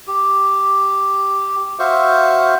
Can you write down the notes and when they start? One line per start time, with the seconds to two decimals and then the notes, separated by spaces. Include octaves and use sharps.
0.07 G4
1.79 F#4 C5 E5 F5 C#6